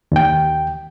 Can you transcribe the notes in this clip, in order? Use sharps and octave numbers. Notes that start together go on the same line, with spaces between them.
D#2 G5